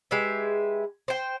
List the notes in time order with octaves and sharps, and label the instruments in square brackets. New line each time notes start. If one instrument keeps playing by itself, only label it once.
[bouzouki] G#3 G4 B4 E5
C5 G5